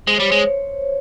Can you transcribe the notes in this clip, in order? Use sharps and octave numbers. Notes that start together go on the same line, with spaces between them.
G#3 C5
G3 C#5
G#3 C5